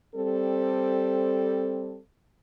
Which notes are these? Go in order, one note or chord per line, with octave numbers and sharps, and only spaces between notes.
G3 C4 A4